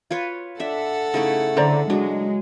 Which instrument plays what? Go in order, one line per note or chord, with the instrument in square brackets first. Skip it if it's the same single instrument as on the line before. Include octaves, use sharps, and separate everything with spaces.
[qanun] F4 B4 C#5
[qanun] D4 E5 [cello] A4 F#5
[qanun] C#3 A3 E4 [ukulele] D#4
[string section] D3 [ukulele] C5 D5 A#5
[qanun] F#3 [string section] G#3 [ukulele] D4